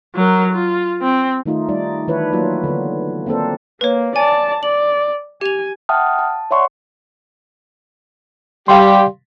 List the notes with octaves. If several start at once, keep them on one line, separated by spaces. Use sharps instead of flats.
F#3 A#4
F4
C4
D#3 A3 D#4 F4
G3 D#4 D5
D#3 E3 D4 E4 B4 C#5
F#3 A#3 F4
D3 B3
A#3 C4 D4 A4 C5
A#3 B4 C#5
D5 G#5 A5
D5 F#7
G4 G#5 F7
E5 F#5 G5 A5 D#6 F6
A5
C#5 D5 E5 F#5 C6 C#6
G3 G4 F5 C6